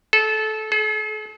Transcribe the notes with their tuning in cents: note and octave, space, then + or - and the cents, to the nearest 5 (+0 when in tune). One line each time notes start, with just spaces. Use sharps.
A4 -20
A4 -45